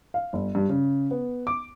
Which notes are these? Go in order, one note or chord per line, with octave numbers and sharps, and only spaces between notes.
F5
G1
G2
C#3
B3
D6